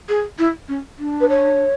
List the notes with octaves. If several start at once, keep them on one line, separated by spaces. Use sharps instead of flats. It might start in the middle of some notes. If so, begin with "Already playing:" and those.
G#4
E4
C#4
D4
B4
C#5